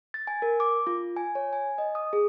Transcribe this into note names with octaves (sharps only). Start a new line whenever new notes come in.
A6
G#5
A#4
D6
F4
G#5
C#5
G#5
D#5
D#6
G#4